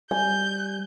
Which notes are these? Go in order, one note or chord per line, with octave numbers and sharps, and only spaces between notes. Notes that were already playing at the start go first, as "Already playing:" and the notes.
G3 G#5 G6